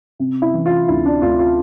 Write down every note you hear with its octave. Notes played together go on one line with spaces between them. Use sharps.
C3
E4
E3
F4
D2 E4
D4
D2 F4
F4